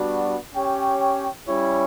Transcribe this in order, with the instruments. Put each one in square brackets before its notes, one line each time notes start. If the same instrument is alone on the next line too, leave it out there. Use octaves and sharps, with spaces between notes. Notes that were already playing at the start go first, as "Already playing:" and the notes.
Already playing: [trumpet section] G3 B3 D4 F#4
C#4 G4 C#5 G5
G3 C#4 E4 G4 C#5